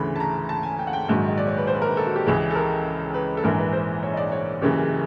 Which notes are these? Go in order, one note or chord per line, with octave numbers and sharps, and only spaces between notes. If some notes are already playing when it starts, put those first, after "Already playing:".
Already playing: D2 C#3 E3 B5
A5
A#5
A5
G#5
G5
F#5
G5
A#1 G#2 D#3 F#3
D#5
D5
C#5
B4
C5
B4
A#4
B4
A4
F#4
G4
C#2 C#3 E3 G#4
A4
A#4
B4
A4
A#1 G#2 E3 A#4
B4
C5
C#5
D#5
D5
C#5
F#1 F#2 C#3 E3 G4